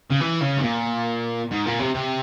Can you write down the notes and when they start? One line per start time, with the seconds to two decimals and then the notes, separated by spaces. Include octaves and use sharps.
0.11 C#3
0.21 E3
0.42 C#3
0.58 G#2
0.63 A#2
1.52 G#2
1.66 A#2
1.80 C3
1.95 C3